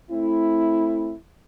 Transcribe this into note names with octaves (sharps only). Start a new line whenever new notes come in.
A3 C4 E4